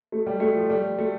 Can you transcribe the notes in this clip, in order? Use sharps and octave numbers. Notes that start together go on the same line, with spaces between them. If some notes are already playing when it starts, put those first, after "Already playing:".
A3
G3
A3
F3
G3
A3